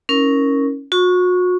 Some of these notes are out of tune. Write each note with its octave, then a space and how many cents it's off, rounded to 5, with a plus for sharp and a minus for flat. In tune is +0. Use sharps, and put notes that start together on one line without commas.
C#4 +0 E4 -35 A#4 +0
F#4 -40 C#6 +0